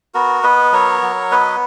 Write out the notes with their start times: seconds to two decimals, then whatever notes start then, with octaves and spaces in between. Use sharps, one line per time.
0.14 B3 F#4 A#4
0.44 B3 B4 D#5
0.72 F#3 A#4 C#5
1.02 F#3
1.32 B3 B4 D#5